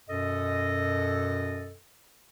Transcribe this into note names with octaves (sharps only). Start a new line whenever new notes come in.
F#2 B2 A4 D#5